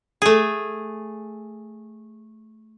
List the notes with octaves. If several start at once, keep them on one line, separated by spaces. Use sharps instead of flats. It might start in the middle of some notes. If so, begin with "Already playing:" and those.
A3 G#4